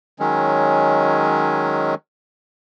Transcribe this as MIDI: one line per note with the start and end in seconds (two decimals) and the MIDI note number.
0.19 1.94 51
0.19 1.94 54
0.19 1.94 56
0.19 1.94 61